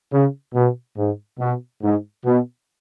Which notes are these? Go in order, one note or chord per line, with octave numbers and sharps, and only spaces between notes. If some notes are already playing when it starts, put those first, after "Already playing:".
C#3
B2
G#2
B2
G#2
B2